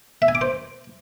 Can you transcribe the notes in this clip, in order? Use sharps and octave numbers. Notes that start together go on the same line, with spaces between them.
E5
G#5
D6
C5